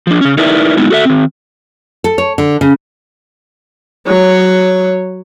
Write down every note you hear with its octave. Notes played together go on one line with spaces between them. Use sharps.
F3 D4
C#3 C#4
D#4 E4 A#4 B4 D5 E5
G#3 B3 D#4 E4
F#4 A4 C#5 E5
D#3 C4
A4
C#5
D3
C#3
F#3 C#5